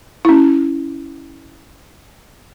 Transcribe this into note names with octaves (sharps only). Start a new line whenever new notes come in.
C#4 E4